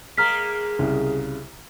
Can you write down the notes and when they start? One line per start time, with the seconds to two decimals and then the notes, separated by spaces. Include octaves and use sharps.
0.17 G#3 A#3 A#5 F6 B6
0.79 C2 C#3